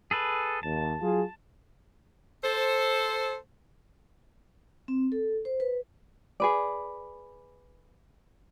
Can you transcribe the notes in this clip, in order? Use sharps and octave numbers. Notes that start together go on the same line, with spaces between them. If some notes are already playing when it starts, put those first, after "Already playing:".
G#4 A4 B4
D#2 A5
F#3 F4 G#4
A4 C5
C4
A4
C5
B4
G#4 B4 D5